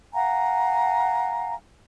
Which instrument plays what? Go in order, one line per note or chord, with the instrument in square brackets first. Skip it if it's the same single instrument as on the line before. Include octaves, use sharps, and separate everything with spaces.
[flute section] F5 F#5 G#5 A#5